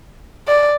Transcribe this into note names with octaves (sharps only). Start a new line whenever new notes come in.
D5